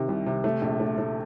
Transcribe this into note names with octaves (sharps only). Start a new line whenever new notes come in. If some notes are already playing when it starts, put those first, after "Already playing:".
Already playing: C3 D#3
C2
C3
A3
A#1
A3
A3